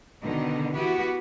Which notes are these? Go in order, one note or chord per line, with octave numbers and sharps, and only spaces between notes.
B2 D3 D#3 D4 D#4
E3 B3 E4 F#4 G4 B4